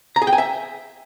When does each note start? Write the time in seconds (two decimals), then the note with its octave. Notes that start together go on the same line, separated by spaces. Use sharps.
0.16 A#5
0.22 G#4
0.27 G5
0.33 G#5
0.38 E5